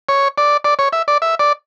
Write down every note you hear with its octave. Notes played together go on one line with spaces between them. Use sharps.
C#5
D5
D5
C#5
E5
D5
E5
D5